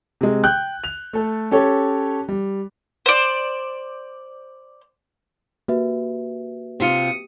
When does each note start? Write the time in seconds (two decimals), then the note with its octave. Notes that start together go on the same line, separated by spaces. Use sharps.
0.21 C3 G#3
0.44 G5 F#6 G6
0.84 F7
1.13 A3 A4
1.51 C#4 G4 A4 C#5
2.28 G3
3.06 C5 D5
5.68 A#3 F#4 G4 B4 E5
6.80 C3 F4 G4 D#6 C#7